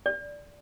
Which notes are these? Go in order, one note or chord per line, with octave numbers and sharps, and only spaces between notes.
D5